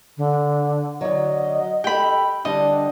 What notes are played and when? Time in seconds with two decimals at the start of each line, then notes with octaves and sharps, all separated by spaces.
0.17 D3
1.01 D3 F#3 D#5
1.84 G4 A4 G5 B5
2.45 D3 G3 D4 D#5